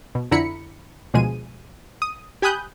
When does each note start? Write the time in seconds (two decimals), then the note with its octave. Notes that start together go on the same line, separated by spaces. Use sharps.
0.15 B2
0.31 F2 D3 E4 A#5 B5 C#7
1.14 D2 B2 F3 G#3 G#4 D#7
2.02 D#6
2.42 G4 G#5 B5 D#6 F#6 G6